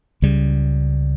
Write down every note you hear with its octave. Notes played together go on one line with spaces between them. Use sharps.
C#2 C#3 G3